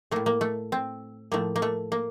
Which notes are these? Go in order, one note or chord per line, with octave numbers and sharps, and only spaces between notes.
A2 A3 A#3
A#3
A3
C4
A2 F3 A3 A#3
A#3
A3
A#3